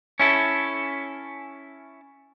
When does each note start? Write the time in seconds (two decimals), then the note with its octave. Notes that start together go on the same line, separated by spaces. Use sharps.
0.20 C#4 E4 A4